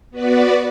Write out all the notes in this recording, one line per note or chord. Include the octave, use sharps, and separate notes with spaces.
B3 F#4 B4 D5